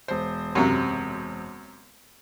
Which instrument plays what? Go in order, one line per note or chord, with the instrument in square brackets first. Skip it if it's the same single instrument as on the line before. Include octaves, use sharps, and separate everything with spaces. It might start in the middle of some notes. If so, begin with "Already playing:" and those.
[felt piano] E1 C5
[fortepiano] F#2 C3